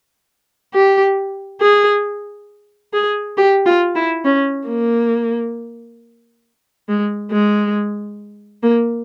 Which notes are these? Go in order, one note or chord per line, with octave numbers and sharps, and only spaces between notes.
G4
G#4
G#4
G4
F4
E4
C#4
A#3
G#3
G#3
A#3